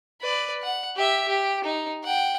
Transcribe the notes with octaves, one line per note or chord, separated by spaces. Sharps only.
B4 D5
F#5
G4 E5
G4
D#4
F#5 G5